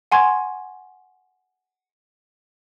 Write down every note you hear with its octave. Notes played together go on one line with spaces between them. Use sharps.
F#5 G#5 C6 C#6 G#6